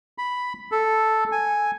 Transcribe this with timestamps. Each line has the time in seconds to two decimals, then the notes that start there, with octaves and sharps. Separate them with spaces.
0.18 B5
0.72 A4
1.32 G#5